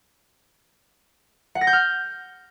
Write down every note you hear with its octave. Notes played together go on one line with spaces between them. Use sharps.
F#5
A#6
G6
F6